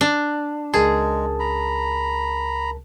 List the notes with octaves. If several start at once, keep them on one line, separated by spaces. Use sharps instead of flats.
D4
C#2 G#3 G#4 A#4 A5
A#5 B5